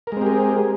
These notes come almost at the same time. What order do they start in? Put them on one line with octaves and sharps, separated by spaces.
A#4 G#3 C4 G4 G#4